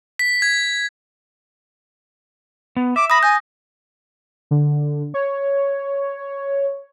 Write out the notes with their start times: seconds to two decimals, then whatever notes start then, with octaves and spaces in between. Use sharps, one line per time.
0.19 B6
0.42 G#6
2.76 B3
2.96 E5 D6
3.10 B5 D#6 A#6
3.23 G#5 G6
4.51 D3
5.14 C#5